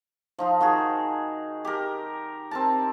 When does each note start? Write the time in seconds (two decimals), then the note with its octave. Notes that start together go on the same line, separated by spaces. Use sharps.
0.39 F3 D#4 F4
0.61 D#3 F#4 G#4
1.65 G4 A#4
2.51 C4 A#4 A5